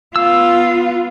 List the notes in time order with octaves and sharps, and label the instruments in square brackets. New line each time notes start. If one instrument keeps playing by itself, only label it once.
[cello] B3 F4 [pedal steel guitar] E6